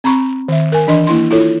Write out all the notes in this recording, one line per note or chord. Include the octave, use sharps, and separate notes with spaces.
C4 A#5 B5 C#6
D#3 E5
A#4 G#5
E3 D4 D#5 C6
A#3 E4 C6
E4 F4 A4 C#5